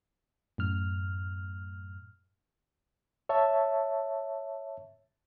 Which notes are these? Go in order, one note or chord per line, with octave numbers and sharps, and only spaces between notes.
F#2 A2 F6
C#5 E5 A5